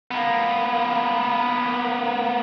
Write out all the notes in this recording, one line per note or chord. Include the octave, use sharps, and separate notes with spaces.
A#3 B3